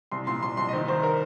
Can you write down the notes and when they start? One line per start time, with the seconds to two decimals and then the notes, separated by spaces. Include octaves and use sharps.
0.11 C2 C6
0.27 A#2 C6
0.43 C2 C6
0.57 C2 C6
0.68 D#5
0.73 D#3 C5
0.88 D#3 C5
1.03 A#4